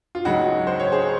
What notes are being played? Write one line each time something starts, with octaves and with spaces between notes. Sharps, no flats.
F4
C#2 C#3 F#3 D#4 F#4
C5
C#5
G#4 C5